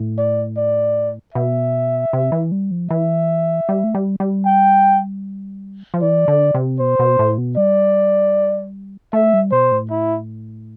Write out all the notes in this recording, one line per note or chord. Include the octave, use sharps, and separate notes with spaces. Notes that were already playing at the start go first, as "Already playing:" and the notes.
Already playing: A2
D5
D5
B2 E5
C3
E3
G3
F3
E3 E5
G3
A3
G3
G3
G5
F3
E3 D5
D3
C3
B2 C5
B2
A2
B2
G3 D5
A3 E5
G3
B2 C5
A2
E4